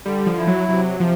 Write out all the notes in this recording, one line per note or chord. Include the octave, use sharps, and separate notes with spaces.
D3 G3
F3
E4
F#3
C3 F#3
C3 F3